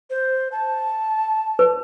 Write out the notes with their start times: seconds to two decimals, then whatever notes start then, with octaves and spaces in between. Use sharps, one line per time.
0.10 C5
0.52 A5
1.59 B4